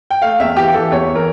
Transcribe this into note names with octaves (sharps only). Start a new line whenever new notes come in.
G5
A3 F5
E2 E5
E3 G4
E3 A4
E2 C#5
E3
A#4